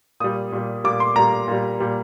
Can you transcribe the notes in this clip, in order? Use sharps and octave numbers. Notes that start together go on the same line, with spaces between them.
A#2 G3 D#6
A#2 G3
A#2 G3 D6
C6
A#2 G3 A#5
A#2 G3
A#2 G3